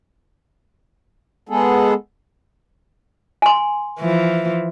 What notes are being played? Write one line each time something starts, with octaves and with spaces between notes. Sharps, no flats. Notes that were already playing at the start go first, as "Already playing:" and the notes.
G#3 B3 G#4 A4
G#5 C6
E3 F3